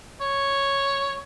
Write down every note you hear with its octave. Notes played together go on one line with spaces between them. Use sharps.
C#5